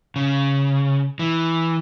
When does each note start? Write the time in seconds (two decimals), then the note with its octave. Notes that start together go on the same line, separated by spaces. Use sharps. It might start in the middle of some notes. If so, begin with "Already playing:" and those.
0.16 C#3
1.19 E3